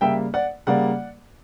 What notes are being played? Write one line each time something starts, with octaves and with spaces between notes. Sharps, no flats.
C#3 G3 A#3 E5 G5
D5 F#5
C#3 G3 A#3 D5 F#5